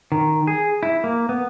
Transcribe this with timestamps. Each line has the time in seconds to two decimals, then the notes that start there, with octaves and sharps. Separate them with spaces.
0.12 D#3
0.47 G#4
0.83 E4
1.04 A#3
1.29 B3